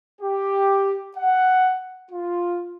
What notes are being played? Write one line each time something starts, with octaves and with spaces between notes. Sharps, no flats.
G4
F#5
F4